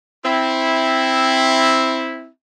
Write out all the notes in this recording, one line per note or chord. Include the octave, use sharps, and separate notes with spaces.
C4 E4